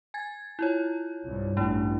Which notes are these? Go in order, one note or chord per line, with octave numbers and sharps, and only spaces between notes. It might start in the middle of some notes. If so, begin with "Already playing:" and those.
G#5 G#6 A6
E4 F4 C#5
C2 G2
A1 G2 A3 D4 E4